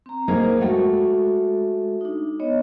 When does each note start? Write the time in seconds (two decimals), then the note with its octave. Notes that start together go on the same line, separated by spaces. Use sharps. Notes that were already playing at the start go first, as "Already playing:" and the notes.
0.06 C4 A#5
0.28 A#3 D#4 G#4 C5
0.60 G#3 A3 F#4 A4 G5
2.01 D4 D#4
2.40 B3 C#5 D#5